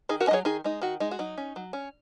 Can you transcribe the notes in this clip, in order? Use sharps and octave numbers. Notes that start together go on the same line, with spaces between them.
D#3 D#4 G#4
F#4 A#4
C#4 D#5
F#3 G#4 C#5
D#3 D#4 G#4
G#3 D#4
D#3 F#4
G#3 D#4
F#4
F#3 D#4
C#4
F#3
C#4